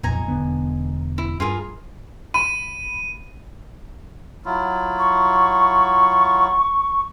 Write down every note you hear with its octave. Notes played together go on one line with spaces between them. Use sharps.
B1 F2 A#2 D#4 G#5 A#5
E1 D3 B3
E4
G2 F4 G#4 A#4
B5 D#7
F#3 E4 F4
C#6